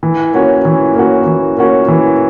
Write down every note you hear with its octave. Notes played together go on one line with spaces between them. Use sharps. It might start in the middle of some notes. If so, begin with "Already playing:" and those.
E3
A#3 C#4 F#4
E3
A#3 C#4 F#4
E3
A#3 C#4 F#4
E3